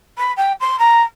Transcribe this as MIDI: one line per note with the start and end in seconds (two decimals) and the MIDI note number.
0.17 0.32 83
0.36 0.52 79
0.60 0.76 84
0.79 1.02 82